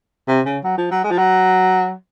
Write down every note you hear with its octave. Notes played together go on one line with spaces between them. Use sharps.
C3
C#3
F#3
F3
F#3
G#3
F3
F#3